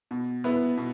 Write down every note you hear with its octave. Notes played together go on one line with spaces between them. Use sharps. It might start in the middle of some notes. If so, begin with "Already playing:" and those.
B2
B3 E4 B4
B2